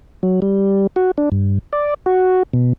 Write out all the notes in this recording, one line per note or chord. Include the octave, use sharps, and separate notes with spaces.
F#3
G3
F#4
D4
G2
D5
F#4
B2